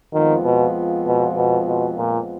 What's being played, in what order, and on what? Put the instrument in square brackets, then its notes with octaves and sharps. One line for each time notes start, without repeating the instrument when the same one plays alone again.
[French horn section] F2 F3 G#3 B3 F4 [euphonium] D#3
[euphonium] B2
B2
B2
B2
A#2